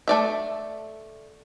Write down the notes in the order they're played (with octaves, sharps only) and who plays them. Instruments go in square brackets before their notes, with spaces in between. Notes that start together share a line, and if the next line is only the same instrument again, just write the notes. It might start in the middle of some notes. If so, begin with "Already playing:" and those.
[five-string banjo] A3 D5 E5